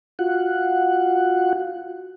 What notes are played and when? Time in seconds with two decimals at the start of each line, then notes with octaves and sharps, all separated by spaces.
0.19 F4 F#4 F#5